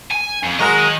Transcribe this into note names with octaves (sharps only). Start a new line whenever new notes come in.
G#5
F2
D#3 F#3 G#3 A#4 D#5